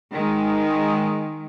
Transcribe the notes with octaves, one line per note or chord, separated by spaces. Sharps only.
D#3 G#3